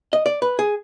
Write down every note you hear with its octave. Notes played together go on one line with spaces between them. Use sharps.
D#5
D5
B4
G#4